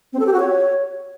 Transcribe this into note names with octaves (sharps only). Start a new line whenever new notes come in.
C4
A4
G4
F#4
C#5